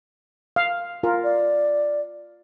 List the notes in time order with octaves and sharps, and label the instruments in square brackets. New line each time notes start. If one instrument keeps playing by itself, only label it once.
[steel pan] F5
F4 A#4
[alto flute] D5